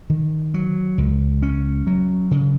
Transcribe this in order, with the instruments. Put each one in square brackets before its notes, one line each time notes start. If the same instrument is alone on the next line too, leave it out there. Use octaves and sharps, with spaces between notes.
[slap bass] D#3
F#3
C#2
C#4
F#3
C#3